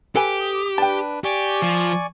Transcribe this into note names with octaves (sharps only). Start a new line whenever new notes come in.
G4 A4 B4 G#5
D6 D#6
D4 B4 G5 A5
G4 D5 G#5 C#6
F3